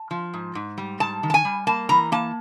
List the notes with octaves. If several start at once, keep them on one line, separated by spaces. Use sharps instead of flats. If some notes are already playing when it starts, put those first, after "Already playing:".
Already playing: A5
F3
G#2
G#2
G3
G#2 A5
D#3
A5
G#5
G3
A#3 A5
E3 A#5
A#3 A5